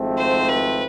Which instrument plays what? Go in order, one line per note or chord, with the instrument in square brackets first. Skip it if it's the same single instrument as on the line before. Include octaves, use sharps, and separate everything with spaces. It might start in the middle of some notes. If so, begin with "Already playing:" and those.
Already playing: [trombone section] G#1 G#2 F3 A3 C4
[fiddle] C5
B4